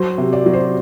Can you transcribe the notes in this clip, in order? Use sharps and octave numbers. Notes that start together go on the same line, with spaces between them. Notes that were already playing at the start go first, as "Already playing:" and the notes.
Already playing: F#3 C5
C3
D5
F#3
C5